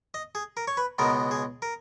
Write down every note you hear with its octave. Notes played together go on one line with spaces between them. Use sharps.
D#5
G#4
A#4
C#5
B4
C#2 B2 G#3 B3 A#4
G#4
A#4